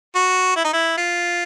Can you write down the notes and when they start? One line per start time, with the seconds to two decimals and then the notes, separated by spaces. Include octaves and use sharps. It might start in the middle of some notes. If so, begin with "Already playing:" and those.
0.15 F#4
0.56 E4
0.65 D#4
0.73 E4
0.98 F4